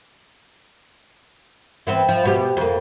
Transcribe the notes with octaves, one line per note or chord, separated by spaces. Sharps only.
E3 B3 C4
F3
B2 G4
F2 A#3